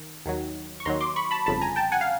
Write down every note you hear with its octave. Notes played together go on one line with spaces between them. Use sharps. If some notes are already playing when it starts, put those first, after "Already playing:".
Already playing: D#3
D#2 D#3 F#3
C#6
D#2 D#3 F#3 A#5 C6
C6 D6
B5 C#6
A5 B5
G1 F2 C#3 A5 B5
G#5 A#5
G5 A5
F#5 G#5
F5